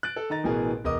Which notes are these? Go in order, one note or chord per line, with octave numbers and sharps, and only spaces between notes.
F#6 A6 D7
A4
D#3 D#5 A#5 A6
A1 B2 E3 G#4 A#4
E1 A#4 D#5 D6 D#6